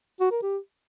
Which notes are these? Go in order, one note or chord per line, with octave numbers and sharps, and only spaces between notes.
F#4
A#4
G4